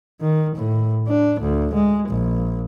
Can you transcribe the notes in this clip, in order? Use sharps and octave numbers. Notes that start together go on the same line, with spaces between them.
D#3
A2
D4
D2
G#3
A#1